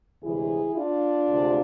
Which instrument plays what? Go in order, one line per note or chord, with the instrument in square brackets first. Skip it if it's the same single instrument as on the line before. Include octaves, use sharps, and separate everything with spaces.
[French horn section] D2 C3 E3 G#3 E4 G#4
D4 F4
D2 C3 G#3